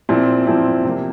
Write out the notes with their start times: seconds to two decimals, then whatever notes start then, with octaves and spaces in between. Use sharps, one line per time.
0.09 A#2 F3 C4 E4
0.46 A#2 F3 C4 E4
0.84 C3 F3 A#3